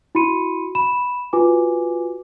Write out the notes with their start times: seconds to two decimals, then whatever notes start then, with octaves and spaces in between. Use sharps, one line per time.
0.15 E4 F#4 B5 C6 C#7 D#7
0.75 B5 E7
1.33 F4 F#4 B4 G#5 D6